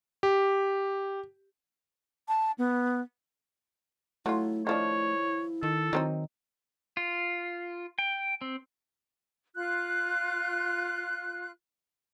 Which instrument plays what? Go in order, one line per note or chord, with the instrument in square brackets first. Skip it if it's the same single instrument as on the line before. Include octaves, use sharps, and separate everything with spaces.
[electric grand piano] G4
[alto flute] A5
B3
[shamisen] F#3 F4 [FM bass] A3 [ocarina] E4
[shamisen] D#3 F3 D4 [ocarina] E4 [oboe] C#5
[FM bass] D#3 [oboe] A4
[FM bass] D#3 [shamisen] F#3 C4 D#4
[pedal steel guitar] F4
G5
C4
[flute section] F4 F#6